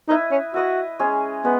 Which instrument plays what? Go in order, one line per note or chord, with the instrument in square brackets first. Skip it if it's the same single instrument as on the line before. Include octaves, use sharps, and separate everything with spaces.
[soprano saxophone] D#4 [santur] E4 B4 D#5
[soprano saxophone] C#4
[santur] E4 B4 D#5 [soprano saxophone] F#4
[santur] G#3 C#4 G#4
[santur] G#3 [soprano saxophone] B3